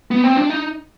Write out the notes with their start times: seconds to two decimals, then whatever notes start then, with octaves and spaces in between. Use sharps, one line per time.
0.11 B3
0.24 C4
0.37 D4
0.50 D#4